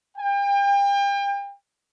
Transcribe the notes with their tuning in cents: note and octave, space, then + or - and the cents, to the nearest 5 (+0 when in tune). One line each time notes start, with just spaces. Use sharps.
G5 +35